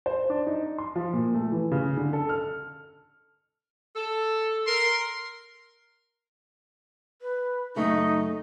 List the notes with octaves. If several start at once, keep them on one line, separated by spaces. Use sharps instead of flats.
C5
D4
D#4
C6
F3
A#2
A3
E3
C#3
D3
A4
F6
A4
A#4 C6
B4
F#2 C#3 A3 D#4